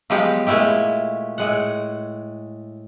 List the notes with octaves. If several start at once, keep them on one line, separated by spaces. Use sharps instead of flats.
F3 F#3 G#3 B3 G4 F5
A#2 G#3 A3 E4 G4
A2 G#3 F#5